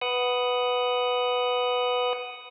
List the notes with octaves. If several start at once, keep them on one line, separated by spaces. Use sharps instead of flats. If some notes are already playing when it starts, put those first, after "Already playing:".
B4 F#5 D#6 F#6